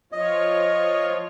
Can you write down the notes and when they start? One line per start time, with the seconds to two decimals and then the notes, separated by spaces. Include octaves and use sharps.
0.12 F3 F4 C#5 D#5